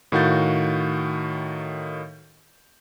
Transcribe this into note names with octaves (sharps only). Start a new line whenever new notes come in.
A2 D#3 F#4 F5 G6 A6